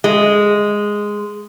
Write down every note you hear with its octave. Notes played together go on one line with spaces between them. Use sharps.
G#3